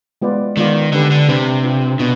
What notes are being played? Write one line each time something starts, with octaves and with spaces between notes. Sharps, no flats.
G#3 B3 F4 B4 D5
D#3 G#3 B3 F4 B4 D5
D3 D4 G4 B4
D3
C3 D4 G4 B4
D4 F4 B4
B2 D4 F4